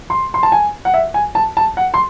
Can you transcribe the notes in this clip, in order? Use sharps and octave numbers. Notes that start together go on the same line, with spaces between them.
C6
C6
A5
G#5
F#5
E5
G#5
A5
A5
F#5
C6